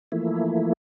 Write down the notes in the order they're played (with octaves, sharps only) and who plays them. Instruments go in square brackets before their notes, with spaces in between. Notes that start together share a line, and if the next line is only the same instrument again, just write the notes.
[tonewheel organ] E3 F3 A3 A#3 E4